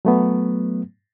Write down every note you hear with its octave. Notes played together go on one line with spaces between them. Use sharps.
F#3 A3 B3